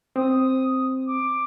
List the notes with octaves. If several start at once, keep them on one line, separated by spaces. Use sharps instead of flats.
C4 D#6
D6